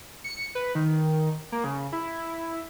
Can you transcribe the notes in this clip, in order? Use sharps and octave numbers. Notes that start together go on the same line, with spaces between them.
C#7
B4
D#3
A#3
C#3
E4